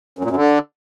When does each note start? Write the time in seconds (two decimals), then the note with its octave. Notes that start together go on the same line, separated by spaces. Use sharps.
0.19 F#2
0.25 A#2
0.30 F#2
0.36 D3